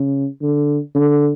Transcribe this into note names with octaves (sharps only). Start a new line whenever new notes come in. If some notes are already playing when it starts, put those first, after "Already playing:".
Already playing: C#3
D3
D3